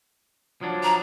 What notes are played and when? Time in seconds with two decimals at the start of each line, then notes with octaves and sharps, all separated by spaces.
0.61 F3 F#3 D4
0.83 A#5